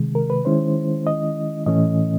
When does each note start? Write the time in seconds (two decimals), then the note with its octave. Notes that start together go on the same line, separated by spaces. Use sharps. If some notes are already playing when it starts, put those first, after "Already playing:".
Already playing: C3 D#3 G#3
0.15 A#4
0.30 B4
0.45 D#3 G#3 C#4 E4 C5
1.07 D#5
1.66 A2 E3 A3 C#4 D#5